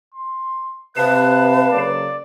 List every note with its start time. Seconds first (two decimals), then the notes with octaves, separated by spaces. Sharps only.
0.14 C6
0.97 C3 B4 F5 A5 F#6
1.71 C#3 F#3 A#3 D5